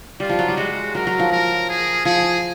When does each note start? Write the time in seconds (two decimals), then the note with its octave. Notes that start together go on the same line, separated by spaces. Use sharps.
0.20 G3 F4
0.29 F3
0.39 F#3
0.48 G3
0.57 G#3 F#4
0.95 F#3 A#4
1.07 F#3
1.20 F3
1.32 A#4
1.69 G#4
2.05 F3 G#4